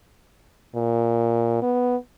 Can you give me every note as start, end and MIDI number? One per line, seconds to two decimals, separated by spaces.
0.75 1.61 46
1.62 1.96 59